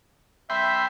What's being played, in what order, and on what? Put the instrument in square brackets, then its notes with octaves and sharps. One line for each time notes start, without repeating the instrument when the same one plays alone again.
[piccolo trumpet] E5 [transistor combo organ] G5 B5 C6